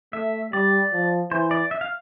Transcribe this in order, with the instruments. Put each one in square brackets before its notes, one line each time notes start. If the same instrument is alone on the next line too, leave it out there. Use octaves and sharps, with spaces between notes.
[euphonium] A3 [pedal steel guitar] E5
[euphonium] G3 [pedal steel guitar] D5
[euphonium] F3
[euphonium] E3 [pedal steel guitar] C5
[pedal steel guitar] D5
E5
F5